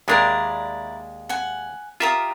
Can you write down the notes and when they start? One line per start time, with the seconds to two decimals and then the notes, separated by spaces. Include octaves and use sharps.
0.08 D#2 G#3 D4 E4 A#4 D5
1.29 F#5 G#5
2.00 F4 G4 A#4 E5 D#6